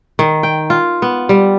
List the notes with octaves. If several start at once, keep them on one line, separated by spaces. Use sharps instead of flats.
D#3
G5
F4
B3
G3